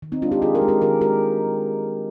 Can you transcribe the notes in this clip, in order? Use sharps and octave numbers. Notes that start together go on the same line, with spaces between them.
D#3
C4 D#4
G#3 D4 F4
D#4 G4
D#3 F4 G#4
G4 A#4
G#3
G4 A#4
D#3 G4 A#4
G#3 G4 A#4